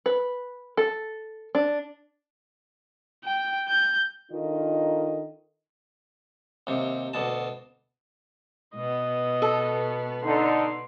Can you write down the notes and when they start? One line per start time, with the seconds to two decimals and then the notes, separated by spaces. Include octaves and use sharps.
0.06 B4
0.77 A4
1.55 D4
3.24 G5
3.68 G6
4.31 D#3 D4 F4 A4 A#4 D#5
6.67 D#2 C3
7.14 D2 B2 A5
8.75 B2 B3 D#5
9.42 A4
10.23 D3 D#4 C6